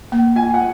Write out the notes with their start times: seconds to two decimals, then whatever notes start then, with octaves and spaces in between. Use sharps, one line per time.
0.12 A#3
0.36 F4 G#5
0.54 F#5